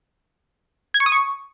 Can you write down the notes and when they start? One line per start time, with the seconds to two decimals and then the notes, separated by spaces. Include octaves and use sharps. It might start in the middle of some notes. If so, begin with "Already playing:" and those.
0.94 G#6
1.00 C#6
1.06 D#6
1.12 C#6